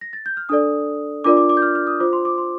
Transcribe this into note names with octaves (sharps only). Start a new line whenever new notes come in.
A#6
A6
G6
F6
D4 A4 D5 D#6
D4 F4 A#4 D5 D6
D6
D6
G6
F6
F6
D#6
F4 C5 D6
C6
D6
C6